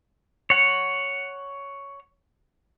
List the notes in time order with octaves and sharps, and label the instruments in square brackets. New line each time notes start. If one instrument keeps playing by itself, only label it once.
[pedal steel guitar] C#5 F#5